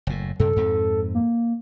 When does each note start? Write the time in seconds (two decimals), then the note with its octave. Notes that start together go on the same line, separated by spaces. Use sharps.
0.07 F#1 A2
0.40 F#2 C3 A4
0.56 F2 G#2 C4
1.15 A#3